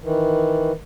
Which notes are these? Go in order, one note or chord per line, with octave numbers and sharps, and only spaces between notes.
D#3 E3